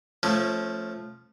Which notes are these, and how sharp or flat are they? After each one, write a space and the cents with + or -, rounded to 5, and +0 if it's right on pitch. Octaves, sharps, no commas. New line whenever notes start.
F3 +0 A3 +0 C#4 -20